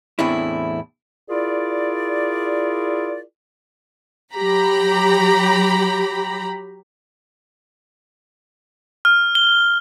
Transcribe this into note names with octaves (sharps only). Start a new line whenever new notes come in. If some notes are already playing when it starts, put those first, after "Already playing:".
E2 A2 C4 D4 E4
E4 F4 G#4 A#4 D5
F#3 G4 A#5 B5
F6
G7